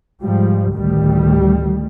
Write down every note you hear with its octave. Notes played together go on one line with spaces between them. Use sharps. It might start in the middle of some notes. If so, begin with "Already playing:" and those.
G#2 F3 G3
A1 D2 D#3 G3 A3